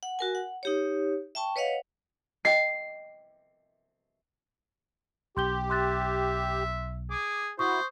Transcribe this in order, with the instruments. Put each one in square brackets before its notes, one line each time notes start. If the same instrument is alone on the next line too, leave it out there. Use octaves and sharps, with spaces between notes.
[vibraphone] F#5
F#4 A#4 G#5
F#5
D#4 G4 C#5
E5 G5 A5 C#6
B4 C#5 D#5 F5 F#5
[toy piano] D#5 G5 [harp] C7
[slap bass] B1 [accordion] G4 [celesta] C6 G6 G7
[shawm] E5 [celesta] C6 F#6 A6
[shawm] G#4 [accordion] D6
[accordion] E4 F#4 [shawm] C5 [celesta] C#6 D#6